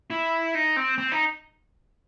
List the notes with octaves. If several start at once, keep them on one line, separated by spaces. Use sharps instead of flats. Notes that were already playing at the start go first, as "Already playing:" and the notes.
E4
D#4
C4
C4
D#4